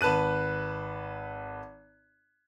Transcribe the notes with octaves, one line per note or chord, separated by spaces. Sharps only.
G#1 B4 A5 F#6 D#7